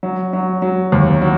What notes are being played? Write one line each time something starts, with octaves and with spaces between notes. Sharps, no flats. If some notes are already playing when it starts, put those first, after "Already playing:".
F#3
F#3
F#3
D#2
F#3